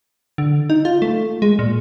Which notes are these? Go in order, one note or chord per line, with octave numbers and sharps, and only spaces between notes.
D3
D#4
F4
A3
G#3
A#2